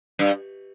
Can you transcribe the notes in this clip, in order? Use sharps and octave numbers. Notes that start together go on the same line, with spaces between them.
G2